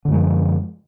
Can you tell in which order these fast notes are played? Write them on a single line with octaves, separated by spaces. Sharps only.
D3 F#2 G#3 F3